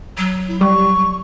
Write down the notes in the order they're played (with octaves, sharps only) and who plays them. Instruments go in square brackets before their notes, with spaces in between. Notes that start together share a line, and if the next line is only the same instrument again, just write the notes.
[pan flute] F#3
[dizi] E4
[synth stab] G3 [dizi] C#6